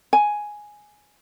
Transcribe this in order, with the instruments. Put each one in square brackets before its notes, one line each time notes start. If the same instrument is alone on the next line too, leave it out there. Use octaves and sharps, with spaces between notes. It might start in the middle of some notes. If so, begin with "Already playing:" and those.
[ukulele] G#5